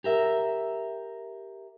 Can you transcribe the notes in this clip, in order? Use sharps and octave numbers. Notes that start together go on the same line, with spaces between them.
G4 A#4 E5